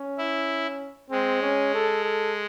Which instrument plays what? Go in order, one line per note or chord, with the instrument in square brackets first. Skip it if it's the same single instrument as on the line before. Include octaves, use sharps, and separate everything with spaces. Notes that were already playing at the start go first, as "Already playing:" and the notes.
Already playing: [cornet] C#4
[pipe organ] E4
[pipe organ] G#3 [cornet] C4
[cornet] C#4
A4
A4